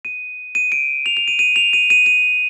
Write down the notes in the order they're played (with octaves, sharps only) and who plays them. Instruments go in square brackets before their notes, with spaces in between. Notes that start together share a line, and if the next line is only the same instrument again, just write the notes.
[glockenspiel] D#7
D#7
D7
F7
F7
D#7
D#7
F7
D#7
D#7
D#7